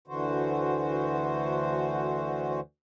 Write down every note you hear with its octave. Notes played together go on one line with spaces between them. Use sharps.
D2 D3 E3 F#4 C5